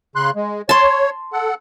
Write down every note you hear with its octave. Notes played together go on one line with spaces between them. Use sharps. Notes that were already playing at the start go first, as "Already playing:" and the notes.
C#3 C6 F#6
G#3
C#5 A5 C6
A4 F#5